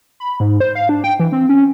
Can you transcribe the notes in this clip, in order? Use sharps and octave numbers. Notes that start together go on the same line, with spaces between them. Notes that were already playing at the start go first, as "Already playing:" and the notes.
B5
G#2
C5
F5
D4
G5
E3
C4
C#4